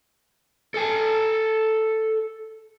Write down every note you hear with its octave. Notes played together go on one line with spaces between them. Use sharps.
A4 G#5